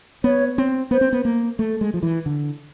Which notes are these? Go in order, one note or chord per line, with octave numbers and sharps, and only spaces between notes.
B3 C#5
C4
B3 C5
C4
B3
A#3
A3
G#3
F3
E3
D3